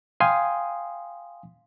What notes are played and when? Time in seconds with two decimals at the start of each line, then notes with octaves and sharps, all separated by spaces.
0.20 F5 G5 G#5 C6 D#6